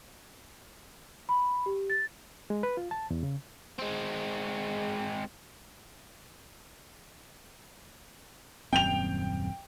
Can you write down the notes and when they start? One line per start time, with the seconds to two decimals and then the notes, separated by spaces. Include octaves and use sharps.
1.29 B5
1.66 G4
1.90 A6
2.50 G#3
2.63 B4
2.77 F4
2.91 A5
3.10 E2
3.23 C#3
3.79 G#3 C4
8.73 D#1 F#2 C4 G5 F7